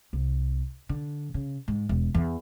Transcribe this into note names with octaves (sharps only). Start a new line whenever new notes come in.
C2
D3
C#3
G#2
E1
E2